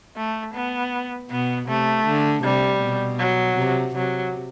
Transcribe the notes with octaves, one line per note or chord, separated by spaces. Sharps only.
A3
B3
B2 B3
C3 A3
D3
C3 G3
B2
F#3
C3
C3 F#3